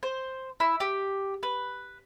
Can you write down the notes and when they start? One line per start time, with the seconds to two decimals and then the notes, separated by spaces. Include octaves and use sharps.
0.03 C5
0.60 E4
0.80 G4
1.43 B4